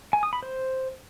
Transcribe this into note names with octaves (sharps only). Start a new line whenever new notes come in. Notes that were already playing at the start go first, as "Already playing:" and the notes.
G#5
D#6
B5
C5